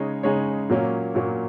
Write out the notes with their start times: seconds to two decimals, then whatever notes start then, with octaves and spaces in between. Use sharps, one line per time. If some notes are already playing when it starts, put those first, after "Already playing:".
Already playing: C#3 G#3 D#4 G#4 C#5
0.23 C#3 G#3 D#4 G#4 C#5
0.69 A#2 F#3 A#3 C#4
1.15 A#2 F#3 A#3 C#4